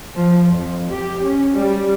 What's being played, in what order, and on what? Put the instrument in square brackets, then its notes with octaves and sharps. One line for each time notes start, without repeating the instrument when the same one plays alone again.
[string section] F3
F2
G4
C#4
G3